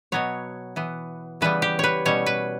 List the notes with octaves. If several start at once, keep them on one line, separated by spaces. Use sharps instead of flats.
B2 F#3 B3 C#5
E3 B3
C#3 E3 G3 B3 B4
G4
B4 C#5
B2 G3 C#4 C#5
B4